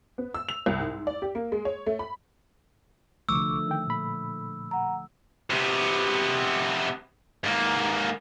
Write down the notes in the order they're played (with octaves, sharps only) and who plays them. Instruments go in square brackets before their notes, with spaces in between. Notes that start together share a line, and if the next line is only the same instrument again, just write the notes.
[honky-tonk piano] B3
E6
F7
C2
G#2
D5
G4
A#3
G#3
C#5
A3
B5
[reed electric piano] C2 C#6 D6 [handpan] D3 F3 A3 [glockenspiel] E6
[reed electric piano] D#3 G5
A#2 B5
[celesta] F#5 A#5
[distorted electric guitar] C3 B3
G#2 A#3